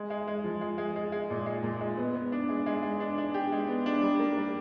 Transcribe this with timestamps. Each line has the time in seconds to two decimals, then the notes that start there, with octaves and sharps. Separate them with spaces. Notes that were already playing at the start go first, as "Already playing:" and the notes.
Already playing: G#3
0.10 G#3
0.28 G#3
0.44 F3
0.61 G#3
0.78 G#3
0.96 G#3
1.12 G#3
1.30 A#2
1.46 G#3
1.63 A#2
1.81 G#3
1.97 B3
2.15 B3
2.32 D4
2.49 G#3
2.66 G#3
2.83 G#3
3.00 D4
3.18 D4
3.34 G4
3.52 G#3
3.68 B3
3.86 D4
4.02 G3
4.19 A#3
4.37 G3